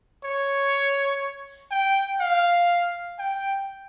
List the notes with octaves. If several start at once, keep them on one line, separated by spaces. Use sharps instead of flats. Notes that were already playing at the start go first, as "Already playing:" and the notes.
C#5
G5
F5
G5